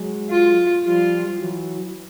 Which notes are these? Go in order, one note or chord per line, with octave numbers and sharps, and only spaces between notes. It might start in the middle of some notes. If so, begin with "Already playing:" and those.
Already playing: F#3 G#3
F4
F3 G3 F4
E3 F#3